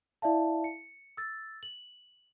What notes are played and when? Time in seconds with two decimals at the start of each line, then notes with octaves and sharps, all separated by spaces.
0.22 E4 D5 E5 F5 A5
0.64 C#7
1.17 E6 A6
1.63 F#7